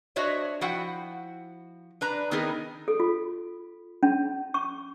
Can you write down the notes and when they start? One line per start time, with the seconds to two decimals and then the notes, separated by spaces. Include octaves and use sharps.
0.16 D4 F#4 C5 C#5 D#5 E5
0.61 F3 E4 F#4 F#5 G5
2.01 D4 B4 A#5
2.31 D#3 B3 C4 D#4 G#4 A#4
2.88 A4
3.00 F4
4.03 C#4
4.54 C#6